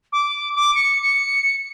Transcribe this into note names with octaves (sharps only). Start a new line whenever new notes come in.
D6
D6
C#7
C#7